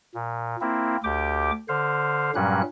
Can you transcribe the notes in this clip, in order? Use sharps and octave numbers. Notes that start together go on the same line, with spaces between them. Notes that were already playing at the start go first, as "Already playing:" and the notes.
A#2
A#3 C4 E4
D2 G4 G5 D6
D3 C5 F5
G2 A#2 F#3 G3 C#4 F#6